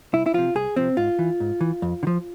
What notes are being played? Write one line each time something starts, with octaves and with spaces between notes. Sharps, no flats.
C2 E4
E4
C3 F3 F4
C2 G#4
C3 F3 C4
G#2 F4
E3
G#2
E3
F2
D3
F3